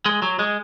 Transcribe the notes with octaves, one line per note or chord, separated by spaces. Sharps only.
G#3
F#3
G#3